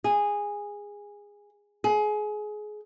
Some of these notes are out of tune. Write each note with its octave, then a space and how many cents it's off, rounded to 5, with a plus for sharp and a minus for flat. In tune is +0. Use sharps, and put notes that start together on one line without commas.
G#4 -15
G#4 +25